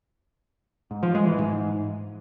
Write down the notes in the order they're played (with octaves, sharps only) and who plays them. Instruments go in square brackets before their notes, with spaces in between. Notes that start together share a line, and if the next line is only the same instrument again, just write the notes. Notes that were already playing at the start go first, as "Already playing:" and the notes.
[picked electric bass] G#2
F3
G#3
E3
G#2